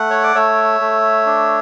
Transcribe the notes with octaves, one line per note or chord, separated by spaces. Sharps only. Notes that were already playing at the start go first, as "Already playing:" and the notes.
Already playing: A3 F#5
C#5
D5
A3 C#5 E5
A3
D4